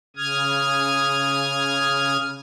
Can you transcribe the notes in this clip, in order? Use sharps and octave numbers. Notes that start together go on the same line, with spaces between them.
C#3 D#6 F6 G#6